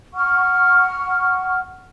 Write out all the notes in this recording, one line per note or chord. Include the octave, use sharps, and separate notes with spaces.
F#5 C#6 F6